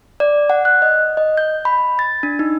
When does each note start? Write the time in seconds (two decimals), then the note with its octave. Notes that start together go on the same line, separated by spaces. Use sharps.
0.20 D5
0.50 F#5
0.65 F#6
0.82 D#5
1.17 D#5
1.37 G6
1.65 B5
1.99 A6
2.23 D4
2.39 D#4